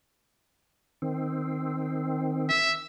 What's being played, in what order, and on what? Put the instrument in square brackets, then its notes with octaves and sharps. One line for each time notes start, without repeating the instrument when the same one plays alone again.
[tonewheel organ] D#3 C4
[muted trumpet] E5